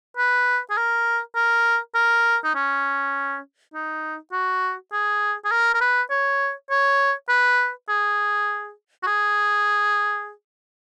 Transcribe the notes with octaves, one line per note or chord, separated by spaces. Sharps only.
B4
G#4
A#4
A#4
A#4
D#4
C#4
D#4
F#4
G#4
G#4
A#4
A#4
B4
C#5
C#5
B4
G#4
F#4
G#4